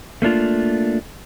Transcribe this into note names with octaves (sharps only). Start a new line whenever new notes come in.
A3 A#3 D4 F4